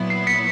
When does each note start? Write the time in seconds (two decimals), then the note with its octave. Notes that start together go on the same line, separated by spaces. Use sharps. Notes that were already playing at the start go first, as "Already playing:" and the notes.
Already playing: A#2 F#3 B3 E4
0.10 C7
0.27 B6 C#7